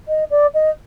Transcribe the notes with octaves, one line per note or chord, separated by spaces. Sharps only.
D#5
D5
D#5